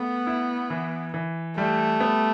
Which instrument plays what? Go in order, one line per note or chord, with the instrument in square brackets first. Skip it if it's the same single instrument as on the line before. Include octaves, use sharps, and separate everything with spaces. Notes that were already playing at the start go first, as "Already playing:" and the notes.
Already playing: [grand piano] A3 [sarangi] B3
[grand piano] E4
E3
E3
[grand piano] G3 [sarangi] A3
[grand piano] B3